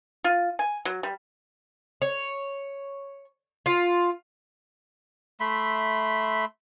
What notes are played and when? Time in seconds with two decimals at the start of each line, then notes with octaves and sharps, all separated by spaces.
0.24 F4
0.59 G#5
0.85 F#3
1.03 G3
2.02 C#5
3.66 F4
5.40 A3 E5 B5 C6